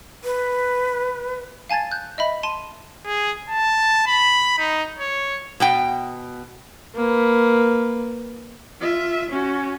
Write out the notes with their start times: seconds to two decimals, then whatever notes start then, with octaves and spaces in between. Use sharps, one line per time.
0.24 B4
1.70 F5 G#5 A5 G#6 A6
1.91 F#6 G6
2.18 D#5 E5 B5
2.43 A5 C6 D#7
3.05 G#4
3.49 A5
4.07 B5
4.58 D#4
4.99 C#5
5.60 B2 B3 G5
6.95 A#3 B4
8.81 F4 E5
9.30 C#4 F#4